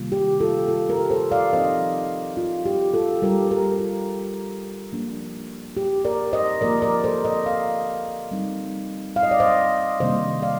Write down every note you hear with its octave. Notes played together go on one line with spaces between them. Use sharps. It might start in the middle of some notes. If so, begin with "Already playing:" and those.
Already playing: C3 D#3 G3 A#3 F4
G4
F4 A4
F4 A4
G4 A#4
A4 C5
D5 F5
F3 C4 D#4 C5 D#5
F4
G4
F4 A4
G3 D4 F4 G4 A#4
G4 A#4
F4
F3 A#3 D4 F4
G4
A#4 D5
C5 D#5
D3 F3 A#3 F4 A#4 D5
A#4 D5
A4 C5
C5 D#5
D5 F5
G3 C4 D#4
F5
D#5
D5
C5 D#5
C3 D#3 G3 A#3 D4 C5 D#5
D5 F5